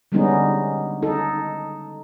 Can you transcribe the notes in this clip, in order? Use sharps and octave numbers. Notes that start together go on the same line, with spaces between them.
D3 G3 G#3 B3 C#4 D#4
D#4 A4